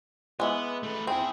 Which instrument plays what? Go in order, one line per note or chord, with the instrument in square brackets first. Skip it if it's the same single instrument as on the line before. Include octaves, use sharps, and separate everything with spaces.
[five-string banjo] E3 G#3 [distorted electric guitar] B3
[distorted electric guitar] A3 B4
[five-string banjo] C4 [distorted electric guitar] E4 G#4